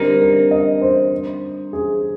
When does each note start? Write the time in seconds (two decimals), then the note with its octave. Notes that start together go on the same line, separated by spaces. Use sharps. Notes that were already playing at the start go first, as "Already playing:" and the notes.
Already playing: D3 G3 C4 D#4 A#4
0.21 A#4
0.51 D#5
0.81 C5
1.73 G#4